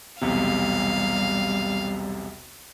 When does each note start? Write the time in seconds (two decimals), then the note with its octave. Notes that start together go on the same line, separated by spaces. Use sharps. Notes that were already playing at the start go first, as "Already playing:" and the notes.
0.21 B1 E2 C3 G3 F5